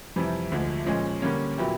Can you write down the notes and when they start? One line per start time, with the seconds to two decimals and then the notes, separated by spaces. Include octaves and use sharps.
0.16 F2 C3 E3 G3
0.51 D2 D3 F3 G#3
0.86 A#2 F3 G#3 C#4
1.22 D3 G3 A#3 C#4
1.58 A#2 F#3 B3 E4 G4